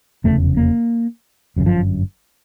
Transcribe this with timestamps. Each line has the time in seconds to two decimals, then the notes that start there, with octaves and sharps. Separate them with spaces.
0.24 F1 E2 C#3 A3
0.57 A#3
1.56 G1 F#2 C#3
1.66 F3